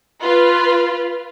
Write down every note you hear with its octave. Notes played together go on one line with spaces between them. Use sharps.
F4 B4